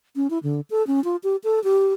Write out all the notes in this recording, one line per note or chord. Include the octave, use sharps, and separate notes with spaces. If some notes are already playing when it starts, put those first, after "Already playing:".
C#4
E4
D3
A4
C#4
F4
G4
A4
G4